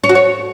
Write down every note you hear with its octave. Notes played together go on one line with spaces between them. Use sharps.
C#5
F#4
C#5